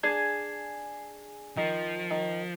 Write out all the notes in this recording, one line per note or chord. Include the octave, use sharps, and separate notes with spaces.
D4 G#4
D#3 F3
D#3